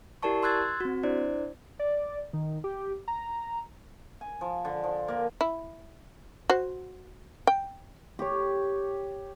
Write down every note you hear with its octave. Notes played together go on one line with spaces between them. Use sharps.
E4 G4 A#4 D5 A5 C#6
C6 E6 F#6 G#6 A6
C4 F#4
D4 E4 C5 D5
D5
D#3
G4
A#5
G#5
F3
D3
F3
A#3
E4
F#4 C5
G5
G4 C#5